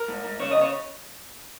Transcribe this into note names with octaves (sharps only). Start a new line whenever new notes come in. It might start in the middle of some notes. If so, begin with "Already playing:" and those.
Already playing: A#4
G#2
G#2
C#3 C#5
D#5
C#3 C#5